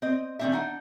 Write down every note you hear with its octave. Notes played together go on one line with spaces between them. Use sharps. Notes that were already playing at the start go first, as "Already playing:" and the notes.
C4 D#5
D3 D#3 G3 C4 D4 E5
D4 D#4 F#5